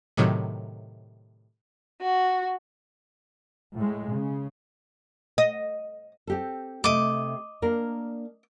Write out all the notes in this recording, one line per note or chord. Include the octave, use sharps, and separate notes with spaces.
A2 C3 D#3 F#3
F#4
A2 G#3
C#3
D#5
C4 G4 A4
C3 A3 D#5 D6
A#3 D4 A#4